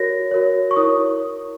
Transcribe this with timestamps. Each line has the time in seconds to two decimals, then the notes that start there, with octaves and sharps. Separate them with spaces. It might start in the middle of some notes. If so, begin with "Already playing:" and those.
Already playing: F#4 A#4 C#5 A#6
0.31 F#4 A#4 C#5
0.71 C#6
0.76 E4 A#4 C#5 D#6